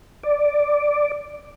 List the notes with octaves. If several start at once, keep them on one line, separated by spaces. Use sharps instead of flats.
D5